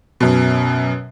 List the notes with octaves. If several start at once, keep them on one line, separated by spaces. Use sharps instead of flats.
F#2 B2